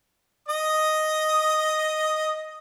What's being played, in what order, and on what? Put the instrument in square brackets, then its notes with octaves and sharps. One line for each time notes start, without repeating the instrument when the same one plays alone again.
[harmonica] D#5 D#6